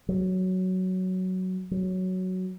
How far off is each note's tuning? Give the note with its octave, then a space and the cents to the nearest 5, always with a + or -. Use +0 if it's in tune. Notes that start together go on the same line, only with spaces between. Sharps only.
F#3 +5
F#3 +5